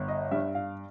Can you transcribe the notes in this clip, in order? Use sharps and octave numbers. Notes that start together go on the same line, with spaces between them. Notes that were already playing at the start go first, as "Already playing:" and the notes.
Already playing: G1
D#5
G2 E5
F5